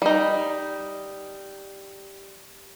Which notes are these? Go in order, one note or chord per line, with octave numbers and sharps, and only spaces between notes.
G3 D#4